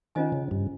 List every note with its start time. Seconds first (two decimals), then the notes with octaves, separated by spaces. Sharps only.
0.15 D#3 C#4 F4 C5 D#5 G#5
0.32 C#3
0.51 G2